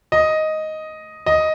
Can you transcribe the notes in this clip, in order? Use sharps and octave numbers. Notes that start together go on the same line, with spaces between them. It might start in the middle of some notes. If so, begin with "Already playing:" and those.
D#5
D#5